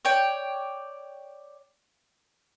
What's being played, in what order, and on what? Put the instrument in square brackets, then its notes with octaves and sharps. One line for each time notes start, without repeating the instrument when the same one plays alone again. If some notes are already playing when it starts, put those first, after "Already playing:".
[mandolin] C#5 D5 G5